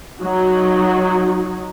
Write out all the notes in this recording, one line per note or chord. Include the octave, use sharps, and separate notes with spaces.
F#3 D#4 F#4